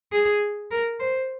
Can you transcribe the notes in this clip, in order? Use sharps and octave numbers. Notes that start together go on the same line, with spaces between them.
G#4
A#4
C5